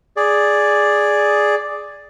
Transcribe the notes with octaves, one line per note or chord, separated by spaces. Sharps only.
G#4 D5